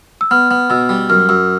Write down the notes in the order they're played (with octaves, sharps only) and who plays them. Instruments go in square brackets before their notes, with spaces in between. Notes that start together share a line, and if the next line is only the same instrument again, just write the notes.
[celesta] E6
[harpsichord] B3 [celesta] F6
[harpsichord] B3
[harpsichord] B2 [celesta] E6
[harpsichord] G3
[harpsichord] F#2 [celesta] F6
[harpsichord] F#2 [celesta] E6